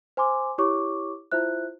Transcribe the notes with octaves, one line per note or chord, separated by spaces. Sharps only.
C5 G#5 C6 D6
E4 G4 C#5 C#6 D6
E4 F4 C5 E5 F#6